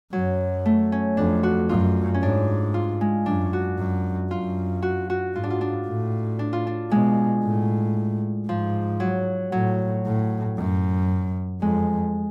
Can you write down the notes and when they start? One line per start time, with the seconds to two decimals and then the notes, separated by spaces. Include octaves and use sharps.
0.13 F#2 F#3
0.65 A3
0.92 C#4
1.17 F2 D4
1.43 F#4
1.69 F#2 F4
2.14 C#4
2.22 G#2 D4
2.74 F4
3.01 G#3
3.26 F#2 D4
3.53 F#4
3.78 F#2
4.31 F#2 F4
4.82 F#4
5.10 F#4
5.35 G#2 F4
5.43 D4
5.50 F4
5.61 D4
5.87 A2
6.39 D4
6.53 F4
6.67 D4
6.91 B2 G#3
7.44 A2
8.48 G#2 F3
9.00 F#3
9.52 A2 F#3
10.05 A2
10.57 F#2
11.61 F2 G#3